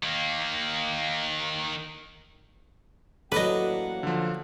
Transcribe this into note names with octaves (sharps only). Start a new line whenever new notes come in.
D#3 A#3
A1 F#3 A#3 A4 B4 D5 D#5 F#5
D3 F3